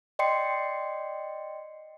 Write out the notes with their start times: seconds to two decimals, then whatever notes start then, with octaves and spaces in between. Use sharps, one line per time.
0.19 D5 D#5 G5 C6 C7 C#7